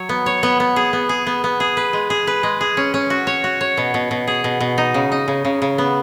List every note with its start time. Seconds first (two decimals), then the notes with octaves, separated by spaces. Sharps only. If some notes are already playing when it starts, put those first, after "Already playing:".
Already playing: F#3 C#5
0.09 B3
0.26 C#5
0.43 B3
0.60 B3
0.76 G#4
0.93 B3
1.09 G#4
1.27 B3
1.44 B3
1.60 G#4
1.77 B4
1.93 G#3
2.10 G#4
2.27 B4
2.43 G#3
2.61 G#4
2.77 C#4
2.94 C#4
3.10 F#4
3.27 C#5
3.44 F#4
3.61 C#5
3.77 B2
3.94 B2
4.11 B2
4.27 G#4
4.44 B2
4.60 B2
4.78 D#4
4.94 C#3
5.12 D#4
5.28 C#3
5.45 C#3
5.62 C#3
5.78 B3